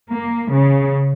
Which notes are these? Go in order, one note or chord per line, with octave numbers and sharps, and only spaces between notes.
A#3
C#3